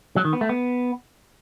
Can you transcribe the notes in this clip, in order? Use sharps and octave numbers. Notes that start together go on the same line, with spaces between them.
F#3
D#3
B3
A3
B3